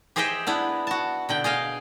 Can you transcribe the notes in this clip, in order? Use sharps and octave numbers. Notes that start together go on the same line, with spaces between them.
G4 G#4 C5 D#5 E5 G5
B3 D4 E4
F#4 A5
B2 D3 G5
G#4 D#5 F5 G5